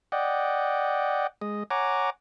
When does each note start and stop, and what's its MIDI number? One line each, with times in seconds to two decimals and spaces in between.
0.12 1.27 74
0.12 1.27 75
0.12 1.27 78
0.12 1.27 79
1.41 1.63 56
1.41 1.63 75
1.71 2.10 73
1.71 2.10 78
1.71 2.10 80
1.71 2.10 82
1.71 2.10 86